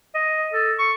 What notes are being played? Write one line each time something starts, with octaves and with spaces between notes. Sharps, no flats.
D#5
A4
C#6